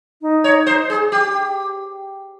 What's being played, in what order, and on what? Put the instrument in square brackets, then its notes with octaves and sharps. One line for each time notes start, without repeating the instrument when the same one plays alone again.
[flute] D#4
[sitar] C#5
C5
G#4
G4